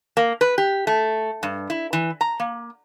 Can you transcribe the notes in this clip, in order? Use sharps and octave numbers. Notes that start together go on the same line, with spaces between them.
A#3
B4
G4
A3
G2
E4
E3
A#5
A#3